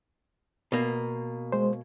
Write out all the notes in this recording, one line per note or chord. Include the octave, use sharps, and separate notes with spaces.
B2 A#3
G#3 C5